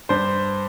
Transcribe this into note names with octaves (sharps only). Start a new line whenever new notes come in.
G2 C5